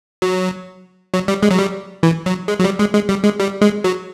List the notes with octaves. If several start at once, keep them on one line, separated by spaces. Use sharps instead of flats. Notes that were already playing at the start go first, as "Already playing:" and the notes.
F#3
F#3
G3
G#3
F#3
G3
E3
F#3
G#3
F#3
G3
G#3
G#3
G3
G#3
G3
G#3
F#3